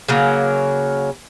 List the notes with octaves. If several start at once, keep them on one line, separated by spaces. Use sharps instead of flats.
C#3 F#3 A#3